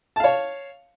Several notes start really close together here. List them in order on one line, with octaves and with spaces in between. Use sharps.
A5 F5 C#5